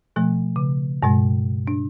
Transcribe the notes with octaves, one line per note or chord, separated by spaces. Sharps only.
B2 F3 A3
C#3
G2 B2 G#3
D4